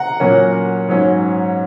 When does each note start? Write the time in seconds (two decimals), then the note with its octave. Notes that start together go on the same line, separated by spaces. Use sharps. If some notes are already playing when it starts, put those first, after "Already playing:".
Already playing: F#5 A#5
0.20 A#2 F#3 A#3 C#4
0.88 G#2 F#3 C#4